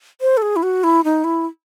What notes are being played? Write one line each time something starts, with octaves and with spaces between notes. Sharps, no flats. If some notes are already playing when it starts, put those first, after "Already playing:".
C5
A4
G#4
E4
F#4
E4
D#4
E4